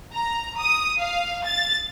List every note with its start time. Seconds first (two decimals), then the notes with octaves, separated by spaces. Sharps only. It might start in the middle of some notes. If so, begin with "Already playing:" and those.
0.13 A#5
0.59 D#6
0.99 F5
1.46 A6